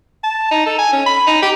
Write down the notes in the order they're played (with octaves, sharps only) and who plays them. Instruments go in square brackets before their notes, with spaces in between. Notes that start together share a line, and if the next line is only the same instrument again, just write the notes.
[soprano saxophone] A5
D#4
A4
G#5
C#4
B5
D#4
G4